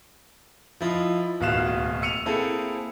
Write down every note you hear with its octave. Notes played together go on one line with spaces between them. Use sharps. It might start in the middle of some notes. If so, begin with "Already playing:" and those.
F3 E4 F4 D#5
D1 D#2 B2 F5 F#6 E7
E6 C#7 D#7 F7
A#3 C4 E4 G#4 A4